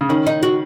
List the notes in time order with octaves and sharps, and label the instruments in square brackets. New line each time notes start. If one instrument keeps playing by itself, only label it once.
[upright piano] C#3
[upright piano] D#3 [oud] C#4
[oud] D#4
F#4